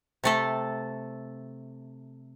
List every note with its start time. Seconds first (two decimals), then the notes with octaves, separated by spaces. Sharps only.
0.24 C3 A3 A4